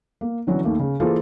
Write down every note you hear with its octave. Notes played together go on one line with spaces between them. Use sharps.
A#3
D3 E3 F#3 C#4 F#4
D#2 A3 A#3
C#3
E3 A#3 F4 G#4 A4 C5